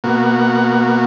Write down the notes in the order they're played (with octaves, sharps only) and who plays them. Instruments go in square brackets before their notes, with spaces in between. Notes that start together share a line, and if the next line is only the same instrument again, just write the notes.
[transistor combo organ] B2 A#3 F#4